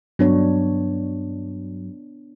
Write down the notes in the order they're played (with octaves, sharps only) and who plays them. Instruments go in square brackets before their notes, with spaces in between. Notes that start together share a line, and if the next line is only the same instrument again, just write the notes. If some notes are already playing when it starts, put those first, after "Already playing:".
[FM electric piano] G2 F#3 [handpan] B3 D4 C#5